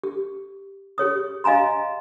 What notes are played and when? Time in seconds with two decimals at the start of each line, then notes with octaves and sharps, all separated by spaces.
0.03 G4
0.98 G4 G#4 C#5 D#6
1.44 D#5 F5 G#5 A#5 C6